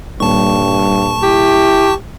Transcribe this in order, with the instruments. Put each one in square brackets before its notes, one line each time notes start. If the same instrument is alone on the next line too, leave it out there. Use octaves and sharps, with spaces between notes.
[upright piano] D#1 [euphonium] G2 [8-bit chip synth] A5 C#6
[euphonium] E4 [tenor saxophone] G4